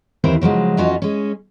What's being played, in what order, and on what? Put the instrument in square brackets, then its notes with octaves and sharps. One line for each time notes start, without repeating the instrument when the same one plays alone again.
[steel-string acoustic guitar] D#2 E3 C4 E4 A#4 C5
C#3 F3 F#3 G#3
F2 E3 C#4 F4 F#4 D#5
G#3 C#4